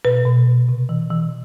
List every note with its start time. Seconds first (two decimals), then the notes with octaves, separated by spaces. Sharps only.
0.05 B2 B4
0.25 B2
0.47 B2
0.69 C3
0.89 E3
1.10 E3